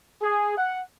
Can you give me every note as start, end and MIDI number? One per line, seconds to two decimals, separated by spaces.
0.22 0.57 68
0.57 0.82 78